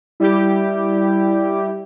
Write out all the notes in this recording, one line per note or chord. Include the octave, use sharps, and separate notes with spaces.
G3 E4 G4